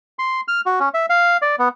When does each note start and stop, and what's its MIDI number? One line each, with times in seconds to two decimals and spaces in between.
0.19 0.41 84
0.48 0.61 89
0.66 0.79 66
0.80 0.89 61
0.94 1.06 76
1.10 1.37 77
1.42 1.56 74
1.59 1.69 59